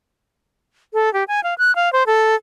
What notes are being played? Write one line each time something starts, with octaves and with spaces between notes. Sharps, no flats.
A4
G4
G#5
F5
F#6
F5
C5
A4